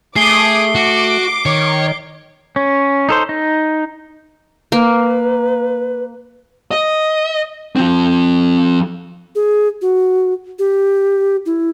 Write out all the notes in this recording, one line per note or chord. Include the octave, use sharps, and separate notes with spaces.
A3 G#4 D6 D#6 C7 G7
F#4 D6
D#3 C#5
C#4
D#4 A4 C5
D#4
A#3 B4
D#5
F3 C4
G#4
F#4
G4
E4